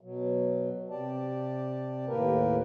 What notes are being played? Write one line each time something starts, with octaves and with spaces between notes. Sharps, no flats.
B2 F#3
C3 G4 D5 A5
D#2 A2 A#3 G4 A#4 B4